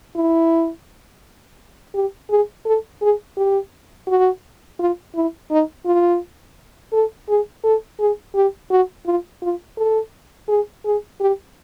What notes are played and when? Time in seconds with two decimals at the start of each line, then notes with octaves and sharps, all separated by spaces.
0.16 E4
1.94 G4
2.30 G#4
2.66 A4
3.02 G#4
3.37 G4
4.07 F#4
4.79 F4
5.15 E4
5.51 D#4
5.86 F4
6.93 A4
7.29 G#4
7.64 A4
8.00 G#4
8.35 G4
8.71 F#4
9.06 F4
9.42 F4
9.77 A4
10.49 G#4
10.85 G#4
11.20 G4